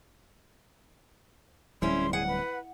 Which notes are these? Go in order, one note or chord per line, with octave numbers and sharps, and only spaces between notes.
D1 G3 C#4 E4 G#4 C6
G#4 F#5
B4